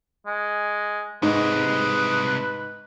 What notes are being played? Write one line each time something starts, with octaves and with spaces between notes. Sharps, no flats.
G#3
G#2 C3 G#3 D#4 B4